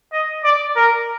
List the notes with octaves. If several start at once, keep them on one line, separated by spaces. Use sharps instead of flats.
D#5
D5
A#4